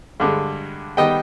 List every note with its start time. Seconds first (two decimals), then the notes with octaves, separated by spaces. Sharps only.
0.20 G2 D3 G#3
0.97 D#3 G3 B3 D#5 G5